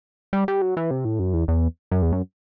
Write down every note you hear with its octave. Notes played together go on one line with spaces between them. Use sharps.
G3
G3
F#3
E3
C3
A2
F#2
E2
E2
F#2
E2
F#2